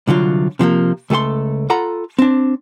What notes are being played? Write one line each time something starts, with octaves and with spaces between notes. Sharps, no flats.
C2 D3 F#3 F4
C3 F3 A3 A#3
C#2 A3 G#4 A4 C6
F4 A4 F#5 A#5 B5
C4 D4